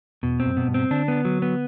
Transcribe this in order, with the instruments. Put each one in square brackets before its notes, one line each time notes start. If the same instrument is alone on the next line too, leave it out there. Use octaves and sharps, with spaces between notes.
[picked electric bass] E2 [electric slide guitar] B2
[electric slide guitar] C4
[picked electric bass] F#2
[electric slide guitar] B2
[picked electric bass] G2
[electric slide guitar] C4
[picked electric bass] D3 [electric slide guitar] D4
[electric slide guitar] B3
F#3
B3